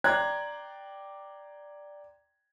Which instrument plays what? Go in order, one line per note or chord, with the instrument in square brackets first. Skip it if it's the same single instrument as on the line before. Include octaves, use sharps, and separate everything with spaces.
[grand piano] D5 G5 A#5 C6 F#6 G#6